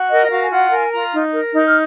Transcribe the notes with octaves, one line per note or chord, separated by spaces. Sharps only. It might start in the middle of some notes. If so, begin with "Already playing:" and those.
Already playing: F#4
A#4 D#5
F#5
F#4 F5
G#5
F4 F#5
A#4 G#5
F4 A#5
D#4
A#4
D#4
F6